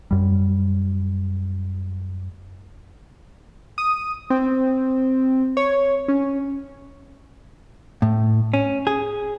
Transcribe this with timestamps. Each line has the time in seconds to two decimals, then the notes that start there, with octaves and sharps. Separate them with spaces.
0.11 F#2 G3
3.78 D#6
4.30 C4
5.57 C#5
6.08 C#4
8.02 A2
8.54 C#4
8.87 G#4